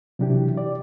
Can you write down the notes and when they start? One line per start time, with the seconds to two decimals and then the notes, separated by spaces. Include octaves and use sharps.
0.19 C3 E3 F#3 D4 E4 G4
0.57 D5